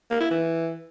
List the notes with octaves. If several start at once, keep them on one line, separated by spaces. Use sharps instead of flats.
A#3
E4
E3